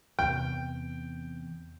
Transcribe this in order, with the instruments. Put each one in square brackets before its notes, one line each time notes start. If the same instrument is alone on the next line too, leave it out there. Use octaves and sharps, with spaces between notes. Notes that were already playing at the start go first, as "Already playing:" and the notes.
[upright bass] E2 C3 [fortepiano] G5